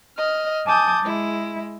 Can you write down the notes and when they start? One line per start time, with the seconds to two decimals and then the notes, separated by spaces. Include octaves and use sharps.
0.17 D#5 F6
0.67 G#5 A5 D6 D#6 G6
1.02 G#3 E4